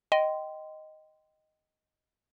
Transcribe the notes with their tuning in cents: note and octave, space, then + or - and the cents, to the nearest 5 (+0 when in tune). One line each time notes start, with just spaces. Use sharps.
D#5 +0 G5 -15 C6 -15